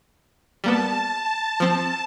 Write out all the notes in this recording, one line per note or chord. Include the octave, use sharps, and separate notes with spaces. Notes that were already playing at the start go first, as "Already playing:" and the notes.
G3 A#3 B3 A5
F3 C4